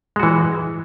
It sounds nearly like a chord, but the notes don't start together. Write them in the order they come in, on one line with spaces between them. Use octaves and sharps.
G#3 F#4 E3